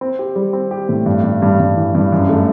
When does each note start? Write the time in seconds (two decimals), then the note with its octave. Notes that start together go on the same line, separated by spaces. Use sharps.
0.01 C4
0.19 G4
0.36 G3
0.53 C4
0.71 G4
0.89 A2
1.06 G2
1.24 G2
1.42 G2
1.60 G2
1.76 E3
1.95 G2
2.12 F#2
2.29 A3